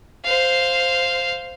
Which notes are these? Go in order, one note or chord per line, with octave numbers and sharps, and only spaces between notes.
C5 F5